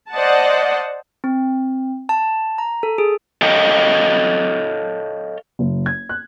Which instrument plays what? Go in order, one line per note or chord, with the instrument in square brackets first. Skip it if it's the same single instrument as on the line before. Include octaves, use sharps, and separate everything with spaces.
[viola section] C5 D5 D#5 F#5 A5
[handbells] C4
A5
A#5
A4
G#4
[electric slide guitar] A4 C#5 D#5 F5 G5
[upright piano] F#1
G#6
F#6